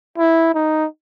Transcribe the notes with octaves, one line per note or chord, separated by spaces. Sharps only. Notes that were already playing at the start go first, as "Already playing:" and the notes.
E4
D#4